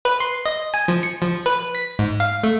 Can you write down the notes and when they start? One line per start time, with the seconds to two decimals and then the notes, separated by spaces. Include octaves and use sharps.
0.05 B4
0.20 C6
0.46 D#5
0.74 G#5
0.88 F3
1.03 C#7
1.22 F3
1.46 B4
1.75 B6
1.99 G#2
2.20 F5
2.43 A3